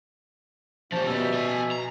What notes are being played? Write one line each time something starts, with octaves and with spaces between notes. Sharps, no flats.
F3 G3 A#3 C#4 C5 A5
B2 B3 E5 F6
A4 G#5
A#5